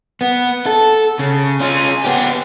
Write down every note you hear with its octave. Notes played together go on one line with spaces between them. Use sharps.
B3
A4
C#3
C#4 F4
B3 G4